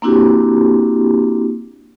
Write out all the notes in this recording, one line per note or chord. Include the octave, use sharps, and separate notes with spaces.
A#3 C4 D4 E4 F#4 G4